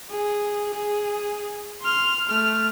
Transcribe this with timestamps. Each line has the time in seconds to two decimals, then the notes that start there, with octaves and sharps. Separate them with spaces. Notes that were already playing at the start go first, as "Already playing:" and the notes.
0.11 G#4
0.74 G#4
1.82 C6 F6
2.29 A3 F6